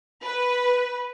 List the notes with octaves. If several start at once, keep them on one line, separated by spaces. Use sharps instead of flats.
B4